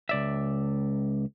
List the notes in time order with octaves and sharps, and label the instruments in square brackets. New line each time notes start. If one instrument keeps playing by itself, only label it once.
[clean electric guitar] C#2 D5 E5